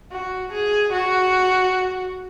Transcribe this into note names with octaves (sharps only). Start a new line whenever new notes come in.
F#4
G#4
F#4